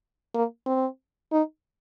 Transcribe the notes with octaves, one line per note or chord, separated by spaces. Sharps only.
A#3
C4
D#4